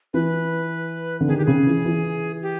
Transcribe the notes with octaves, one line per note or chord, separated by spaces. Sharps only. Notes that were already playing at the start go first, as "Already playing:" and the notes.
E3 B4
D3
D#3 G#4
G4
C#3 G#4
E3
E3
G4